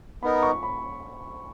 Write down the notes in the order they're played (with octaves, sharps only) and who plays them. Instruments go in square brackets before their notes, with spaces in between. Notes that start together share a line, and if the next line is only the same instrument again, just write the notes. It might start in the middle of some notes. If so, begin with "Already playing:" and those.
[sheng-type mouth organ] B3 D#4 A#4 [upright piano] B5
[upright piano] C#6
B5